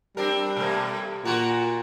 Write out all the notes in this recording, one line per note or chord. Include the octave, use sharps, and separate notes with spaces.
G3 C4 D4 A#4
B2 A3 A#3
A#2 F#4 A#4